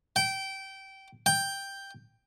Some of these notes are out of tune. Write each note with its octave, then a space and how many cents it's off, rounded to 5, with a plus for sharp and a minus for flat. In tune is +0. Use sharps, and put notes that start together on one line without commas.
G5 -20
G5 +5